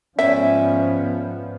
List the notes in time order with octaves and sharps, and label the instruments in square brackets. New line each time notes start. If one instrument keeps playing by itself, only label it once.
[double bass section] G#2 F3 B3 [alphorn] C#4 [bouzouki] C5 D5 G#5 [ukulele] E5